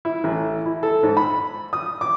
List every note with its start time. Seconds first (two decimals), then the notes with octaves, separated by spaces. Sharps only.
0.05 E4
0.24 A1
0.66 E4
0.83 A4
1.03 G#2
1.17 B5
1.73 D#6
2.01 D6